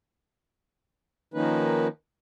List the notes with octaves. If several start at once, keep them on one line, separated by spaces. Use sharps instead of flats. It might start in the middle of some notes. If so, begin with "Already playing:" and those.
D#3 F3 A#3 C#4 D#4 B4